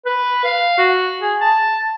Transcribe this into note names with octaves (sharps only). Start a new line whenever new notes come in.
B4
F5
F#4
G#4
A5